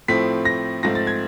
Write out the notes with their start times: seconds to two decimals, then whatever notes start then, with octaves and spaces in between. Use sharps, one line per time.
0.08 A2 F3 A3 C4 B6
0.45 A#6
0.83 G#2 F3 A3 C4 A#6
0.95 A6
1.07 G#6